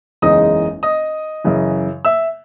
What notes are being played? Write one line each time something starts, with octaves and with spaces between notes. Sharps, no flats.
F#1 E2 C#3 G#3 D#4 D#5 D#6
D#5 D#6
F#2 C#3 E3
E5 E6